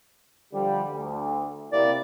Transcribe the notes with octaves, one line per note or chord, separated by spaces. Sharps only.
D3 F3 G3
D2
C3 A#3 E4 D5